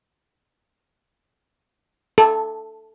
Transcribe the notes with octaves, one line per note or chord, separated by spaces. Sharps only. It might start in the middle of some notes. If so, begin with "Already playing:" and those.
A4